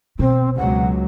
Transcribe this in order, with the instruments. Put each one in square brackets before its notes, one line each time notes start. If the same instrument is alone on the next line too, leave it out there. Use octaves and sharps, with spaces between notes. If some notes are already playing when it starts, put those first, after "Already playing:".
[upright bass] B2 [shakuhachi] C4
[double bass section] C#2 F#3 [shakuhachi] F#5